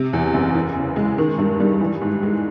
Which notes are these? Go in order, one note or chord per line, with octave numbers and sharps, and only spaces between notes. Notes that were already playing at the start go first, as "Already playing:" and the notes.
Already playing: C3
E2
F#1
E3
C#3
G#3
D#3
G2
G3
E3
G#2
G#3